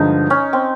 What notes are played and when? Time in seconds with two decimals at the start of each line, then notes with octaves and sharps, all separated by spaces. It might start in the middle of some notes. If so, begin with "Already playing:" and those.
Already playing: G2 D3 F3 G#3 D#4
0.30 C#4
0.53 C4